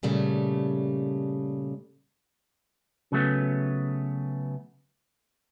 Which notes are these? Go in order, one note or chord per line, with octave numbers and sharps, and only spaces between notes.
A#2 C#3 G3 A3
C#3 F#3 A3 B3